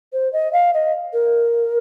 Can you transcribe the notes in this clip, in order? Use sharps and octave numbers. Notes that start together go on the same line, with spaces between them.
C5
D#5
F5
D#5
A#4